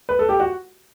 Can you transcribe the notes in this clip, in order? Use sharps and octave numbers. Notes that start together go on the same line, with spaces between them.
B4
A4
G4
F#4